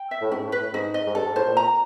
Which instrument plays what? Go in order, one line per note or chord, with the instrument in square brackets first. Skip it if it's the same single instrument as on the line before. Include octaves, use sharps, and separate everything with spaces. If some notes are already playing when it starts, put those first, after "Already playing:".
Already playing: [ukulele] G5
E5
[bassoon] A2
[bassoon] G#2 [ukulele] C#4
[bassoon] A2
[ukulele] B4
[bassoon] A2
[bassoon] G#2 [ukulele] D#4
[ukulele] D#5
[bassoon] G#2
[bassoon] G2 [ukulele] A4
[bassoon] G#2
[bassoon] A2 [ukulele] C5
[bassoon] A#2
[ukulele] A#5